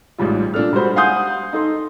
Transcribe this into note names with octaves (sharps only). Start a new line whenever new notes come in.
A1 G#2 G3 F4
A#2 D4 A4 F6
G3 G#3 F#4 C5 B5
F5 F#5 G#5 C6 D#6 G6
D#4 A4 C6